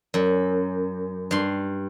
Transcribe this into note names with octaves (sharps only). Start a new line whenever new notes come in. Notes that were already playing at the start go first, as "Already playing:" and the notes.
F#2
G2 C6